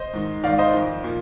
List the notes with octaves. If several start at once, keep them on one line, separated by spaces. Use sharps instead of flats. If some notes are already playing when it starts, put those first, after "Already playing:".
Already playing: C5 D#5
G#2 D#3
G#2 D#3 D5 F5
C5 D#5
F2 D#3
A#2 F3